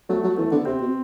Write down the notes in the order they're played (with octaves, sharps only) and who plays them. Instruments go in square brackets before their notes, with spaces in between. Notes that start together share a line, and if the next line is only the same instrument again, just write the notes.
[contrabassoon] F#3 [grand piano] A3
[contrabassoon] F#3
[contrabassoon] E3 [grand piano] A3
[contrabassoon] D3 [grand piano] B3
[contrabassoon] C3 [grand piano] C4
[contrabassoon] B2